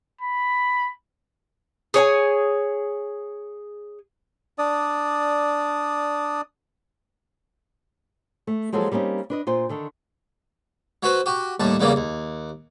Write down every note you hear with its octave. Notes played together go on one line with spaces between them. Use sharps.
B5
G#4 C#5 D#5 G#5
D4 D5 D#6
A3
F3 F#3 G#3 A#3 F4 A4
G3 A#3 C4 C#4 D#4
D4 B4 D#5
A#2 F4 C5
D3 D#3 A4
F#3 F#4 B4 C5
F#4 G4
D#2 A2 G3 A5
E2 C#3 E3 G3 A#3
D#2